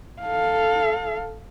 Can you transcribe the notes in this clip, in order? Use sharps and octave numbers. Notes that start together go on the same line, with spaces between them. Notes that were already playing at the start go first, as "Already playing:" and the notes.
A4 F5